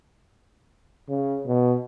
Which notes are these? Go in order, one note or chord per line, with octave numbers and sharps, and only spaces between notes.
C#3
B2